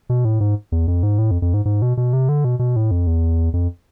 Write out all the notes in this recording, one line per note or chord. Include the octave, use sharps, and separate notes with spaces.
B2
A2
G#2
E2
F2
G#2
A2
F2
F2
G#2
G#2
B2
B2
C3
D3
B2
B2
A2
F2
E2
F2